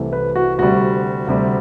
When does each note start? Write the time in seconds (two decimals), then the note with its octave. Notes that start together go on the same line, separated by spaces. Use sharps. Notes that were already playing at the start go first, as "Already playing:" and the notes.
Already playing: C2 C3 E3 A3
0.13 B4
0.36 F#4
0.58 D2 C3 G3 F#4
1.27 D2 C3 G3